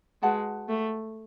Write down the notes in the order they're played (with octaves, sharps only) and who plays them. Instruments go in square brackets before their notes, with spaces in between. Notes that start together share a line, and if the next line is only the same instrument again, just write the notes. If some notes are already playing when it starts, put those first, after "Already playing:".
[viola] G#3 [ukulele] F#4 B4 F#5 A5
[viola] A3